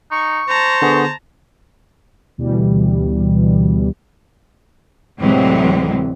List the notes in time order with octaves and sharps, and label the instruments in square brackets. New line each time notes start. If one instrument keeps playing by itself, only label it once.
[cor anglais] D#4 [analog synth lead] C#6
[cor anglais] C5 [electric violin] A5 A#5
[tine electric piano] D3 B3 G#4
[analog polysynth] D2 B2 E3 G3
[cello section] D2 A2 C3 E3 F#3 G#3